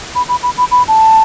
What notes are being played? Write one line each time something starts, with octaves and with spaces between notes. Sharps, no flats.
B5
B5
B5
B5
B5
A5